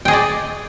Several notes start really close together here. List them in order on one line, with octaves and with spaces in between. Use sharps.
G5 G#4 D#5 D5